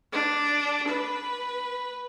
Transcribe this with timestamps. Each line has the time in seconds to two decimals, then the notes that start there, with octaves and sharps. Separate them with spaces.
0.12 D4
0.88 B4